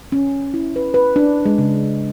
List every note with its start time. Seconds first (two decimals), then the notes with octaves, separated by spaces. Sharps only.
0.12 C#4
0.54 E4
0.76 B4
0.94 B4
1.16 D4
1.45 G#3
1.58 C#3